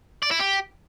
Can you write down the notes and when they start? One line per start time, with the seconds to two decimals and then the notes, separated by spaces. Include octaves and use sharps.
0.23 D5
0.31 E4
0.40 G4